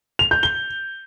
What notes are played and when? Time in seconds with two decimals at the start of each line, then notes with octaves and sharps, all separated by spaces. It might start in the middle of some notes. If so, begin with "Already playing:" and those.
0.19 F7
0.31 G6
0.43 G7